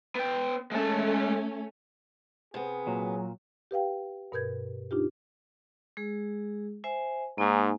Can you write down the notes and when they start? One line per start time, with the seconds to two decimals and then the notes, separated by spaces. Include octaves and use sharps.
0.15 B3 G5
0.71 G#3 A3 C#4 A5
2.54 C3 B3 G#4
2.87 A#2 F#3
3.71 G4 B4 F5 G5
4.32 G2 B2 A#4 B4 G6 G#6
4.91 D4 D#4 F4 G4
5.97 G#3 G#4
6.84 C5 E5 G#5
7.38 G#2 A#3 D#4 G#5